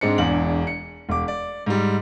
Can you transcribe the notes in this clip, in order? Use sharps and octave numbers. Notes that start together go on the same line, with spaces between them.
G#2 G#3 C4 D4 C#7
E1 E2 D4 F#7
C#7
E1 D6
D5
G#2 G3